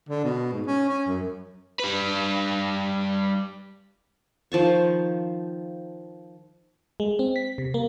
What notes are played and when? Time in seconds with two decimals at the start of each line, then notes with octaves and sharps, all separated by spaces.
0.09 D3
0.24 B2
0.53 G#2
0.67 C#4
0.89 C#4
1.08 F#2
1.80 G3 B4
4.52 D#3 F3 A5 C#6
7.00 G#3
7.19 C4
7.36 B6
7.58 C3
7.74 A#3